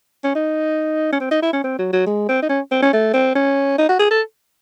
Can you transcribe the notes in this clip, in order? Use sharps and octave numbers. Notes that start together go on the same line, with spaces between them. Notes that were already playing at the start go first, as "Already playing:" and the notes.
C#4
D#4
C#4
C4
D#4
E4
C#4
C4
F#3
F#3
G#3
C4
D#4
C#4
C4
C#4
A3
C4
C#4
D#4
F#4
G#4
A4